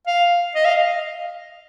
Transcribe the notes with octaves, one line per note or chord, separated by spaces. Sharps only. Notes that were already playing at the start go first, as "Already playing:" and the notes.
F5
D#5
F5